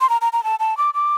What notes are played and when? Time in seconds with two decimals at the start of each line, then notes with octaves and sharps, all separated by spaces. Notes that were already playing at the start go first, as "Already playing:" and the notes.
0.01 C6
0.10 A#5
0.21 A#5
0.33 A#5
0.44 A5
0.60 A5
0.78 D6
0.94 D6